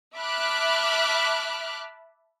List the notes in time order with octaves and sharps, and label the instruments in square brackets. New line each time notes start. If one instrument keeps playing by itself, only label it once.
[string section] E5 A5 B5 D6 F6 F#6